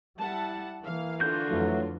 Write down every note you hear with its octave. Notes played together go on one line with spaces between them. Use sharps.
G3 E4 F#5 A5
E3 A#3 F5
D3 F4 F#4 G6
F2 E3 F#3 A3